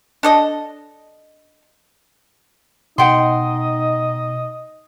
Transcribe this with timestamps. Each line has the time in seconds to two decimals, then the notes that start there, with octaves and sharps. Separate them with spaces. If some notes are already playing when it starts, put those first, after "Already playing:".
0.23 D4 A4 D#5
2.98 B2 D#4 D#5 F#5 G5 C6